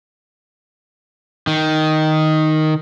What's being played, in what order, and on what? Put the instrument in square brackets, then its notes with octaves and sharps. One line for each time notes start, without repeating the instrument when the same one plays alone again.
[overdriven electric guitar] D#3